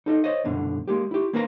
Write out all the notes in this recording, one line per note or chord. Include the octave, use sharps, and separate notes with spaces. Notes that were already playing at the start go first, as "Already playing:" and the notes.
D#4 A4 D#5
C5 C#5 D#5
C2 F#2 B2 D3
G#3 A#3 G4
E4 G4
A#3 C4 A#4 B4 E5 A#5